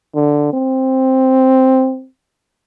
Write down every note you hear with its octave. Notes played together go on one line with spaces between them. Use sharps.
D3
C4